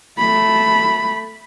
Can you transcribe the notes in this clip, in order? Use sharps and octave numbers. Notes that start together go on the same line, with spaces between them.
A3 B5